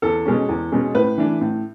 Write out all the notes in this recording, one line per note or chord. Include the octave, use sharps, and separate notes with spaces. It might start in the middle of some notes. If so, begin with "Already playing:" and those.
E2 A4
B2 G#3 C#4
E2
B2 G#3 C#4
A2 B4
E3 A3 D4
A2